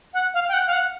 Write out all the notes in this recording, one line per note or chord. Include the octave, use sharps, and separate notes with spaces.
F#5
F5
G5
F#5
F5
F#5